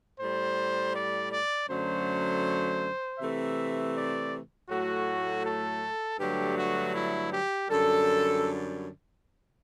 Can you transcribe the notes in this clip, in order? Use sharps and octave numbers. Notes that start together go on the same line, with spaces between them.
A2 G3 C5
D5
D5
F#2 D3 F#3 A3 C5
C3 E3 A3 E5
D5
A2 F#3 A3 F#4
A4
G2 D3 F#3 A3 G4
F#4
E4
G4
F#2 D3 G3 A4